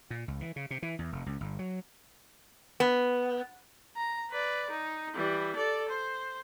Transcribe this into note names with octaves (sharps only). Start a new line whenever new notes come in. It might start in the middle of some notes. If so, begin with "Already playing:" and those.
A#2
C#2
E3
C#3
C3
E3
E2
F1
C#2
G1
F#3
B3
A#5
B4 D5
D#4
E3 G3
A4 D5
C5